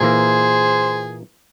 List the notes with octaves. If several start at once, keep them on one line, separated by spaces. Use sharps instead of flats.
A#2 E3 A#3 G#4 C5